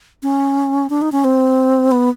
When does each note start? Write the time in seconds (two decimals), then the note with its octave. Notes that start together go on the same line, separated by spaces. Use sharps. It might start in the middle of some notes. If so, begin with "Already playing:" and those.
0.23 C#4
0.90 D4
1.02 D#4
1.12 C#4
1.24 C4
1.91 B3